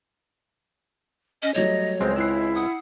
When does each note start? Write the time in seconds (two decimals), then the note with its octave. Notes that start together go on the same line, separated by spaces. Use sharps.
1.43 C#4 D#5
1.54 F#3 G3 A3 C#5 D#5
2.01 C#2 G#3 C4 C5
2.16 E4 E6 F#6 C7
2.56 F#5 D#6